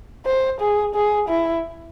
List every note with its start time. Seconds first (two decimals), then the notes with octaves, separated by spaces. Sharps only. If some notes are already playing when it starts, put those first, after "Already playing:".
0.26 C5
0.60 G#4
0.94 G#4
1.29 E4